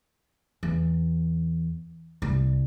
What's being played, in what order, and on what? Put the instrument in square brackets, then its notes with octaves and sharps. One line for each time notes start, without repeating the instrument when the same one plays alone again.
[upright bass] E2
C2